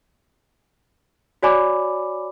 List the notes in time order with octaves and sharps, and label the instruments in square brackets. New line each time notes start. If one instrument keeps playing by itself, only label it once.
[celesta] F#4 C#5 D5 G#5 B5 D6